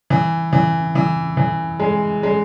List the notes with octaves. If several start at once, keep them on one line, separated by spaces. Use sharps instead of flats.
E3
E3
E3
E3
G#3
G#3